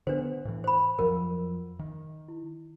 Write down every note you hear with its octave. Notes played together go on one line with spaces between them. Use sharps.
D3 B3 D4 B4 C5
A2 E3
C5 B5
F2 F3 F#3 A#4
D#3
E4